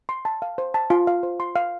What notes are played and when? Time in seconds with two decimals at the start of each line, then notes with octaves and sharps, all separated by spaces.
0.09 C6
0.25 A5
0.42 F5
0.58 C5
0.74 A5
0.90 F4
1.07 F5
1.23 C5
1.40 C6
1.56 F5